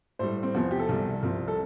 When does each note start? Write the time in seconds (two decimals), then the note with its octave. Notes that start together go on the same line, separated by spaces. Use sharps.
0.19 A2 G3 C5
0.43 C4
0.54 E2 C3 F3 B3
0.71 G4
0.80 A4
0.89 C2 C3 G3
1.23 C2 C3 F3
1.48 A4